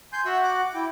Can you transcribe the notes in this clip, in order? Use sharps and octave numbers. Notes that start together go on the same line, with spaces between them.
G#5 C6 G6
F#4 E5 F#5
D6
E4 G5